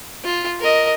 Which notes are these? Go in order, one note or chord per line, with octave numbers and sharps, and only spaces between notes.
F4
A#4 D#5